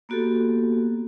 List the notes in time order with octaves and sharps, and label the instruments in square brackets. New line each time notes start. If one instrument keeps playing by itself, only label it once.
[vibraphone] A#3 B3 F#4 G4 A4